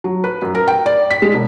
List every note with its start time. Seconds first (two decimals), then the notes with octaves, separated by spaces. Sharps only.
0.04 F#3
0.24 B4
0.42 F#2
0.55 A#4
0.68 G5
0.86 D5
1.11 B6
1.22 G#3
1.34 E1